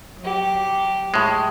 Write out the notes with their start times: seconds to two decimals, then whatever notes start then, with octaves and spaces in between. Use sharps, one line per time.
0.19 F#3 G4
1.14 A2 G#3